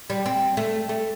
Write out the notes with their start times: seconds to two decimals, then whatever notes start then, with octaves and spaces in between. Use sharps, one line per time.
0.10 G3
0.26 C4
0.57 A3
0.89 A3